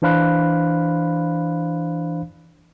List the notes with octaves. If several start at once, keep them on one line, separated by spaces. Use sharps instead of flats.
E3 D4 C5 F5 B5 F#6